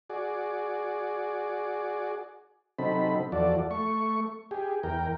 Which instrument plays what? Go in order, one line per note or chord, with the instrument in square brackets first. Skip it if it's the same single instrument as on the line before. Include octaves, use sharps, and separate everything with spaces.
[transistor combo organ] F#4 G#4 D5
C3 F#3 C4 D#4 A4 B5
E2 F3 F#4 A4 D5
A3 C#6
G4 G#4
E2 A#4 G5